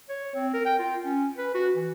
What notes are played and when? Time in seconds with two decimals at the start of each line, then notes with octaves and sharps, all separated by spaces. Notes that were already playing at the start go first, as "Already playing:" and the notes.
0.09 C#5
0.35 C4
0.53 A#4
0.65 G5
0.79 F4
1.04 C#4
1.38 B4
1.55 F#4
1.76 E3